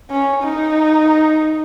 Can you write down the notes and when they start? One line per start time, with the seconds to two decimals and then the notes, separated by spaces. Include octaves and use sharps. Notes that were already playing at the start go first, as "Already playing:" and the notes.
0.10 C#4
0.43 D#4